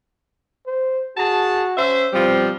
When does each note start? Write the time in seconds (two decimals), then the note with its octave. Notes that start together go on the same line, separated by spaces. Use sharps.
0.67 C5
1.17 F#4 G#4 A5
1.78 C#4 C5 E5
2.13 B2 F3 G3 C4